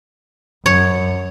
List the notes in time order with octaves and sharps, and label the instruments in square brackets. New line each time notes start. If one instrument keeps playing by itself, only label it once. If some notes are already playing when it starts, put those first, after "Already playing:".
[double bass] F#2 [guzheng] C#5